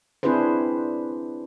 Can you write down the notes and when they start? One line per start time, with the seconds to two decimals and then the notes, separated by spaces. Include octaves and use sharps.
0.23 C4 D4 E4 G#4 B4 C5